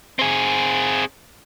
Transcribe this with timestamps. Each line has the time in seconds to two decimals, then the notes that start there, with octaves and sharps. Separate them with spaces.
0.19 C4 G#4